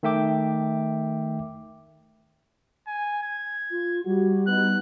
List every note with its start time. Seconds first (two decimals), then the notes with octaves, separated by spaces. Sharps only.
0.03 D#3 A3 E5 G5 D6
2.87 G#5
3.22 G#6
3.71 F4
4.05 G3 F#4 G4
4.47 B3 D#4 F#6